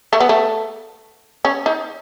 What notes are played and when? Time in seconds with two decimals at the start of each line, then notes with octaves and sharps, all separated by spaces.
0.13 A3
0.20 B3
0.29 A3
1.45 C#4
1.66 D#4